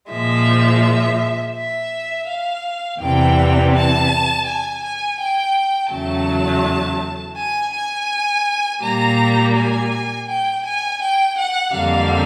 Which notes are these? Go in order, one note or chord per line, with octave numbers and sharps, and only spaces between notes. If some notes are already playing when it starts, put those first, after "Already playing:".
A#2 F3 G#3 E5
E5
F5
E2 C3 E3 G3 G5
A5
G#5
G#5
G5
E2 C#3 F#3 A3 A5
G#5
G#5
A#2 G3 A#3 A#5
G#5
G5
G#5
G5
F#5
F2 D3 G3 A#3 F5